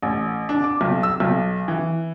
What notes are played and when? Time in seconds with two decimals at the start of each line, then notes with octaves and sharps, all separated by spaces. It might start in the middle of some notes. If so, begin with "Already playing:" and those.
0.02 A1
0.49 D4
0.64 D6
0.81 B1
1.03 E6
1.20 B1
1.68 E3